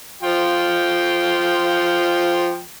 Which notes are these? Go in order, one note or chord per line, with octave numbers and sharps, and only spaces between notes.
F3 F4 G5